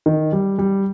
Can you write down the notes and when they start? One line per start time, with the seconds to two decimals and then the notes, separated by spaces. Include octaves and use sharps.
0.06 D#3
0.32 G3
0.58 G3